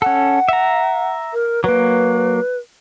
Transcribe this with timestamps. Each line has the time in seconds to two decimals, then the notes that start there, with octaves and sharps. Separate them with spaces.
0.02 C#4 A4 F#5
0.49 E5 A#5
1.33 A#4
1.64 F#3 A#3 B4